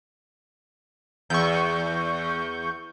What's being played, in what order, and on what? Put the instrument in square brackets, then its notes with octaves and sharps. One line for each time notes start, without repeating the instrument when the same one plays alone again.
[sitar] E2 [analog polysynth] C#6 G6